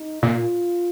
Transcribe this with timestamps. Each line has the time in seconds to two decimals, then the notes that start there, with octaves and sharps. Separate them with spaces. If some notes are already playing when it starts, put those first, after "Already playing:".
Already playing: D#4
0.22 A#2 F4